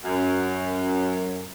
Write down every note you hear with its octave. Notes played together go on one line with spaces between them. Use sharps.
F#2